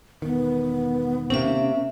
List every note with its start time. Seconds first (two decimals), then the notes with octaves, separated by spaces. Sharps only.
0.22 E1 D#3 B3
1.30 C3 A#3 C4 C#4 E5